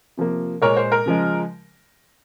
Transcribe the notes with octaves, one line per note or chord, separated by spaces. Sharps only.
C3 F3 A#3
A#2 G#3 A#4 C#5
C5
A#4
C#3 F3 G#3